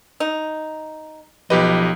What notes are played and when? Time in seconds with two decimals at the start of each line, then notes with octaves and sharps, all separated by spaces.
0.20 D#4
1.50 B1 F3 G4 B4 D#5